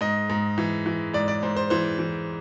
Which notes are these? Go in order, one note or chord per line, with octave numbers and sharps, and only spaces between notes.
G#2 D#5
G#2
E3
E3
G#2 D5
D5
G#2 C5
C5
E3 C5
E3